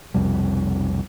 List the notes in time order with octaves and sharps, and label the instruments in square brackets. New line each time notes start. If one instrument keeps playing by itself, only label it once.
[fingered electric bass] B1 F2 C3 G3